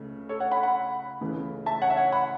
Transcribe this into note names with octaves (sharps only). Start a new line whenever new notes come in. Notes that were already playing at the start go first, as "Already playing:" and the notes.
Already playing: C#2 C#3 A3
A4 C#5
C#5 F#5
F#5 B5
F#5 B5
C#2 C#3 E3 A3
E5 A5
C#5 F#5
E5
C#5 F#5
F#5 B5